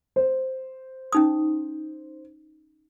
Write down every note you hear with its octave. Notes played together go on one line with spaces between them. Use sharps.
C5
C#4 D#4 D#6